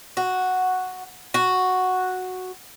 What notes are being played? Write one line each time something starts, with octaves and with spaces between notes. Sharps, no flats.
F#4
F#4